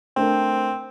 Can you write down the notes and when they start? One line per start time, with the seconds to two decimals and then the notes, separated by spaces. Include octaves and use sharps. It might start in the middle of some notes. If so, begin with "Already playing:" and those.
0.17 A3 C4 D4 A#4